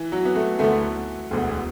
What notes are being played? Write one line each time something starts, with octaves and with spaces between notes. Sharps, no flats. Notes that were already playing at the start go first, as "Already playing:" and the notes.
Already playing: E3
F#3
B3
A3
D2 D3 A3 B3
E1 D2 D3 B3